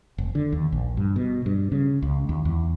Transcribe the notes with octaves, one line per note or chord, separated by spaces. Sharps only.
F1
D3
D#2
A#1
G2
B2
G2
C#3
C#2
D#2
E2